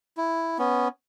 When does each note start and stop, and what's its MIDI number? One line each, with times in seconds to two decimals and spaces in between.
0.17 0.58 64
0.58 0.88 59
0.58 0.88 61